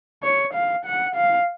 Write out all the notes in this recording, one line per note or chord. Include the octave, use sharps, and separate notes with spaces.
C#5
F5
F#5
F5